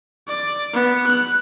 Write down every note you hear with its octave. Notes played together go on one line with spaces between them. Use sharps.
D5
B3
F#6